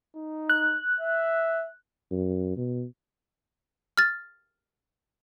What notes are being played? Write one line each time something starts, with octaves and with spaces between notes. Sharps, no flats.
D#4
F#6
E5
F#2
B2
F6 A6